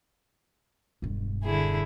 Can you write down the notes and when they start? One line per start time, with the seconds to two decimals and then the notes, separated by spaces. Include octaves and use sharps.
1.02 E1 G2
1.43 D3 E4 G#4